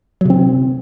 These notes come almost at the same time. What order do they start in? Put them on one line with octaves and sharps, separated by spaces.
F#3 C3 C4